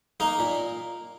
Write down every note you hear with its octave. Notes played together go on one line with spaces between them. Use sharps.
A#3 D#4 A#4
A#2